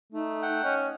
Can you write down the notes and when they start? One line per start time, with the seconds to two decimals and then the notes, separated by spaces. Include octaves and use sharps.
0.13 A3 D#4
0.42 F#5 G5
0.64 C#4 D#5